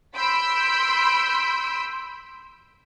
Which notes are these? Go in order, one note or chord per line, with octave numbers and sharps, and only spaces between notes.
B5 C6 E6 G6 B6 D7